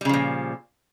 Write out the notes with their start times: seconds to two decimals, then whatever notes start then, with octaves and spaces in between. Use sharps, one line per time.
0.01 G3
0.05 C#3
0.09 F3
0.13 A#2